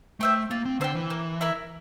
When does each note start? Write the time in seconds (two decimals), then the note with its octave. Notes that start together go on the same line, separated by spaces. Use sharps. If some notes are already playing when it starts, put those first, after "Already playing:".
0.20 A3 C5 E5 G5
0.50 A#3 F4
0.65 C4
0.80 D3 C5 E5 G5
0.95 E3
1.10 A#3
1.41 E4 A#4 E5